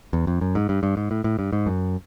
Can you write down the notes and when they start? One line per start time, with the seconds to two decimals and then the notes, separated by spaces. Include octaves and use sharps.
0.13 E2
0.27 F2
0.41 F#2
0.55 G#2
0.69 G2
0.83 G2
0.97 G#2
1.11 A2
1.24 A2
1.39 G2
1.53 G#2
1.66 F#2